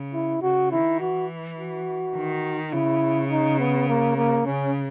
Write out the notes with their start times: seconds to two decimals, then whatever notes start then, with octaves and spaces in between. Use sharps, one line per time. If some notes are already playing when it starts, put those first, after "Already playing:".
Already playing: C#3
0.14 E4
0.42 C#3 F#4
0.72 D#3 E4
1.00 E3 F#4
1.58 F#4
2.16 D#3
2.73 C#3 E4
3.30 D#4
3.59 B3
3.89 A#3
4.16 A#3
4.46 C#3 C#4